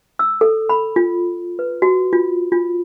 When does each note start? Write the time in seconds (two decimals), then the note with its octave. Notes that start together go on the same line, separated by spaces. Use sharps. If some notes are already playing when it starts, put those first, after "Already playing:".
0.19 E6
0.41 A4
0.69 B5
0.96 F4
1.59 B4
1.82 F#4
2.13 F4
2.52 F4